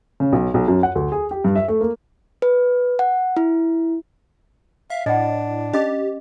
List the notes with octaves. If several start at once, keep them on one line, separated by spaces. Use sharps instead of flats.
C#3
B1
B1
F#2
F#5
D2
G#4
G4
G2
E5
A3
A#3
B4
F#5
E4
E5 F5
A2 D4 D#5 F#5
C#4 G4 D#5 D6